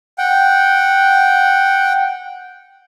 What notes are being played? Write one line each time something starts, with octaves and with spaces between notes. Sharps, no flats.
F#5 G5